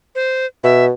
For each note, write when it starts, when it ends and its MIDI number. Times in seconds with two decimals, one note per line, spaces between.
0.15 0.46 72
0.64 0.91 47
0.64 0.85 76